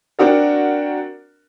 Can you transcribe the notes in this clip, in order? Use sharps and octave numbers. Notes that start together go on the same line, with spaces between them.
C4 D4 F#4 A#4